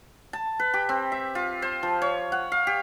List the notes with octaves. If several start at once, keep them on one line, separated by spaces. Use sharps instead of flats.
A5
B4
G4
C4
E5
F4
C5
F3
C#5
F#5
F5
G4